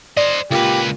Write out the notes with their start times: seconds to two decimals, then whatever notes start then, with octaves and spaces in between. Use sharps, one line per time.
0.17 C5 D5 D#5
0.51 C#2 A#2 G4 B4